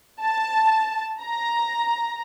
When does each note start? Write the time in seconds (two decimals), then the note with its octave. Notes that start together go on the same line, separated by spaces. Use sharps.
0.22 A5
1.21 A#5